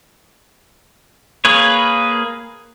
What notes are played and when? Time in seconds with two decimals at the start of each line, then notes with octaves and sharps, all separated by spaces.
1.45 A#3 G#4 B4 C#5